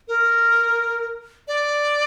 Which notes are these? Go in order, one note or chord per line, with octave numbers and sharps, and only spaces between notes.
A#4
D5